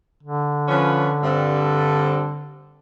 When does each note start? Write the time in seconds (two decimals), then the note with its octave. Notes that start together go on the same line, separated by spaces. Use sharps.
0.23 D3
0.68 F3 C#4 B4
1.22 G2 C4 A4